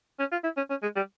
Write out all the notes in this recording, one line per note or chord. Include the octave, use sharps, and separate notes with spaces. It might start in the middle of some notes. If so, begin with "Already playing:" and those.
C#4
F4
E4
C#4
C#4
G#3
G3